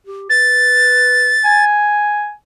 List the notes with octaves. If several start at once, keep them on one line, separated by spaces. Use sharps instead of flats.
G4
B4 A6
G#5